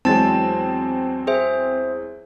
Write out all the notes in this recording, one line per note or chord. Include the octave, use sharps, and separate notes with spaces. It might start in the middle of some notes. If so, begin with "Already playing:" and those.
E2 F#3 G#3 C4 A5 A6
G#4 C5 E5